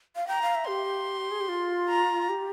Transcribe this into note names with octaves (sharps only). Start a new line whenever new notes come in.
F5
G5 A#5
F5
E5
G4 C6
G#4
G4
F4
A#5
G4